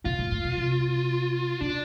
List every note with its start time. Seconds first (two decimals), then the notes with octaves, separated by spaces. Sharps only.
0.05 B2 F4
0.19 A2
0.31 A2
0.44 B2
0.57 C3
1.61 B2 D4